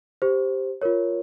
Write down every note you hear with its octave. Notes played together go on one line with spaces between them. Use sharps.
G4 C5
F4 A#4 C#5